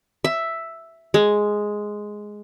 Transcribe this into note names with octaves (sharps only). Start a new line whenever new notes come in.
E5
G#3